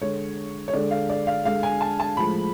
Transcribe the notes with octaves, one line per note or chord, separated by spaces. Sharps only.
D3 G#3 C#5
C#5
D3 G#3 D5
F5
D5
F5
D3 G#3 F5
G#5
A5
A5
A2 F3 G#3 B5